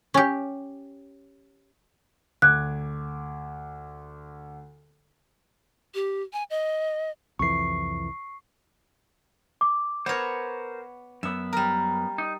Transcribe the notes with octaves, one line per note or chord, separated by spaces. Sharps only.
C#4 G4
D2 D6 F#6 G#6
G4
G#5
D#5
C2 F2 E3 C#6 C7
D6
B3 A#4 C5 C#5
F#2 B3 E5
G3 A#4
D#4